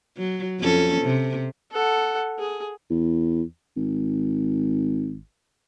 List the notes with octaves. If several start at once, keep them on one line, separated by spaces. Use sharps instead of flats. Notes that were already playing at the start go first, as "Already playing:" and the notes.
F#3
F2 C#4 A4
C3
A4 F#5
G#4
E2
G#1